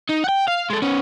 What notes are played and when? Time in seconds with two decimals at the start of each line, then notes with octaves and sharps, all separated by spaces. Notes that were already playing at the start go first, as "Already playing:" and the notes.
0.10 D#4
0.24 F#5 G5
0.48 F5
0.70 G#3 A4
0.82 B3 C#4